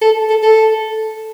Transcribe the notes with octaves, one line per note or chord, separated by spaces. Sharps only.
A4
A4
A4